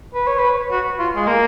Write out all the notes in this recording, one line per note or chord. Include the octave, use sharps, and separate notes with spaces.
B4
C#5
B4
F#4
F4
G#3
A#3